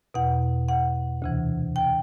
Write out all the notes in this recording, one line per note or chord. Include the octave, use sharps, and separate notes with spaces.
E2 B2 F#5
F#5
D2 C3 E3
G5